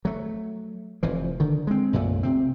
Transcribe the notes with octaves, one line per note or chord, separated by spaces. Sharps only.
F#3 A3
F1 E3 F3
D3 D#3
G#3 C4
B1 F#2 A#2 A3
C3 C4